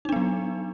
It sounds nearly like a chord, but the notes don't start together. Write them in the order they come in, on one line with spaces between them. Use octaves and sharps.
D#4 D4 B3 F#3